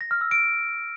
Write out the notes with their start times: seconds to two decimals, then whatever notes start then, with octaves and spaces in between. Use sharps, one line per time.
0.01 A#6
0.11 F6
0.21 E6
0.31 D7